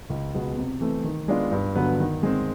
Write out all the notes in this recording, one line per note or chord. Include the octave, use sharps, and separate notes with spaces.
C#2
B2 G#3 B3
C3
E3 A3 C4
D#3
G#3 B3 D4 F4
G2
D3 F#3 B3
D#3
G#3 C4